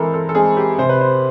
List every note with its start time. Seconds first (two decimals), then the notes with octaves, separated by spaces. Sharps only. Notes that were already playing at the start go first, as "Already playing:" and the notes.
Already playing: E3 G#3 C4 A4 A#4 C5
0.14 A4
0.29 A4
0.35 G#3 C4 G#4
0.57 G4
0.78 C3 C5
0.89 B4
1.01 C5